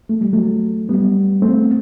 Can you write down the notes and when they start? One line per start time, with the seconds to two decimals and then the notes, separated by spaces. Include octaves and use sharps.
0.09 A3
0.21 G3
0.33 F#3 A3
0.89 G3 B3
1.42 A3 C4